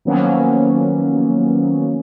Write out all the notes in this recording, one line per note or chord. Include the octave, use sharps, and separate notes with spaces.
D#3 F3 F#3 A#3 B3 C#4